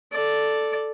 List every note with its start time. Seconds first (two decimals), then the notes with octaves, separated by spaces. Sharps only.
0.12 A4 D5